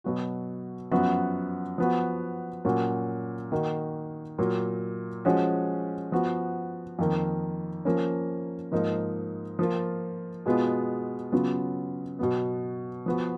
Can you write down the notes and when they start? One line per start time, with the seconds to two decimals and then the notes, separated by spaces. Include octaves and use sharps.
0.04 B2 F#3 B3 F#4
0.91 F#2 F3 B3 F#4
1.78 F3 B3 F#4
2.65 A#2 F#3 A#3 C#4 F#4
3.52 D#3 A#3 D#4 F#4
4.38 A#2 F#3 A#3
5.25 F3 G#3 C#4 F#4
6.12 F3 B3 F#4
6.99 F2 D#3 A#3
7.85 F3 A#3 C#4
8.72 G#2 F3 A#3 D#4
9.59 F3 A#3 F4
10.46 B2 G#3 B3 F4
11.32 C#3 F#3 B3 F4
12.19 B2 F#3 B3
13.06 F3 B3 F#4